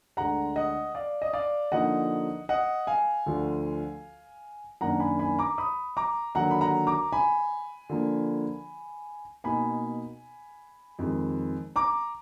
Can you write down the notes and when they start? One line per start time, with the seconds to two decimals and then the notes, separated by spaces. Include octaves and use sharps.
0.17 D2 D3 G#3 F#5 A#5
0.56 D#5 F#5
0.95 D5 F5
1.22 D#5
1.33 D5 F5
1.72 D3 F3 A#3 D#4 D#5 F#5
2.49 D#5 F#5
2.87 F5 G#5
3.26 D2 D3 F3
4.81 F#2 D#3 A#3 D4 F#5 A#5
5.00 G#5 B5
5.19 G#5 B5
5.38 A#5 D6
5.58 B5 D#6
5.97 A#5 D6
6.35 D#2 D3 F#3 F#5 A#5
6.51 B5
6.61 F#5 A#5
6.87 A#5 D6
7.12 G#5 B5
7.89 D3 F3 A#3
9.44 B2 A#3 D#4 G#5 B5
10.99 F2 D#3 G#3
11.76 A#5 D6